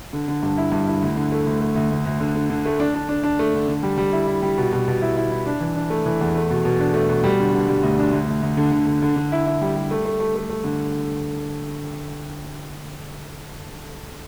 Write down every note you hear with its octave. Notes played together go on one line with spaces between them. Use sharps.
D3
D3
G2
E4
G2
E4
D2
D3
A3
D2
A3
D2
D2
D2
D3
D3
D3
A3
D4
D4
D4
D4
A3
D3
D3
G3
G3
E4
E4
G3
B2
B2
B2
E4
E4
E4
D4
E3
D4
A3
E3
E2
A3
B2
B2
D4
A3
B2
G3
D3
D3
G3
D2
D4
D2
D2
D2
D3
D3
D3
D3
D3
E4
E4
G3
G3
A3
A3
A3
A3
A3
D3